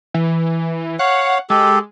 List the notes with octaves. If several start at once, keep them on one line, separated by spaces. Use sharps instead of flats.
E3
C#5 F5 F#5
G#3 G4 A4